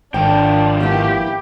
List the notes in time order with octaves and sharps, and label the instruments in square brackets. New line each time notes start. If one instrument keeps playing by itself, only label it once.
[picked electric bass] G#1 [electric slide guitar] F3 A#4 G5 [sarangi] D4 [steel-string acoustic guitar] D5
[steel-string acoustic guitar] A#3 B3 E4 [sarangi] G4